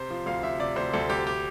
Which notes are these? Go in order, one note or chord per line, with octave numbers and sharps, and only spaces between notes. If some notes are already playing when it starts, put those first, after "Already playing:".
Already playing: C3 C5
F3
D2 F5
C3 E5
C3 D5
D2 C5
D2 A4
D2 G4
G4